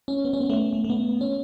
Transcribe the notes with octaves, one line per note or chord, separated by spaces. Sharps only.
C#4
B3
C#4
B3
A3
A3
A3
B3
C#4